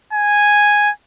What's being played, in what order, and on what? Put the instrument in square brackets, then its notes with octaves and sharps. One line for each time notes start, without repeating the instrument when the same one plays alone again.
[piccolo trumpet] G#5